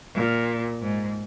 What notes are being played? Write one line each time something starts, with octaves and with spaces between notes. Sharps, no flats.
A#2
G#2